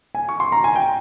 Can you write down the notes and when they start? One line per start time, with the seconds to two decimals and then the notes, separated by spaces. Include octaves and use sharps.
0.15 G#5
0.29 C#6
0.40 C6
0.52 A#5
0.64 G#5
0.75 G5